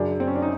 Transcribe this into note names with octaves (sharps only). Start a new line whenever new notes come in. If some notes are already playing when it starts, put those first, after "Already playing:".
Already playing: F#2 C#3 F#3 D4
C4
C#4
D4
D#4